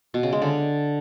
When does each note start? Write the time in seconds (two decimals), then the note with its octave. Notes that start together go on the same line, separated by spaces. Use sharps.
0.14 B2
0.23 C#3
0.32 G#3
0.42 D3